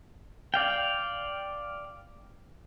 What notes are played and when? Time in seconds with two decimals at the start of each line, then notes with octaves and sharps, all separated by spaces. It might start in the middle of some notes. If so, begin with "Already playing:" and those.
0.54 D5 F5 G5